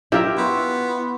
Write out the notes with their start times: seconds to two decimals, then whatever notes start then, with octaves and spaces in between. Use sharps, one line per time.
0.12 E4 F4 G4 A#4 E5
0.37 B3 C6 C#6